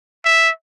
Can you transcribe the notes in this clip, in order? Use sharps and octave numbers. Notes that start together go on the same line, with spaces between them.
E5